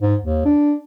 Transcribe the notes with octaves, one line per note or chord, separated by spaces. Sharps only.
G#2
D#2
D4